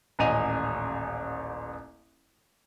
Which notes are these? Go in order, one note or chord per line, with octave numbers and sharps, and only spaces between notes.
D#1 A1 D#5 G#5 D#7 F7